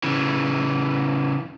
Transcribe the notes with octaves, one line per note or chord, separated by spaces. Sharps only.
C#3 E3